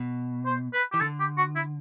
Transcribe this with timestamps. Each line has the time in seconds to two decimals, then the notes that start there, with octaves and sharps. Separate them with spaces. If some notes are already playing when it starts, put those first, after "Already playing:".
Already playing: B2
0.46 C5
0.73 B4
0.92 E3 G4
1.00 D3 A4
1.20 G4
1.38 F#4
1.55 E4